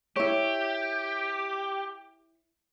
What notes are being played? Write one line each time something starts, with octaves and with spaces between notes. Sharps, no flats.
E4 G4 C#5